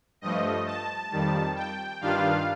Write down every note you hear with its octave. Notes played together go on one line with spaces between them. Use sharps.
G2 F3 A3 D#5
A5
F2 D#3 G3
G5
G2 D#3 G3 D4 F4 F5